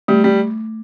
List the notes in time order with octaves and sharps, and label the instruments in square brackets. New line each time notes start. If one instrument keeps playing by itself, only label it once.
[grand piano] G3 [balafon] A3
[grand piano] G3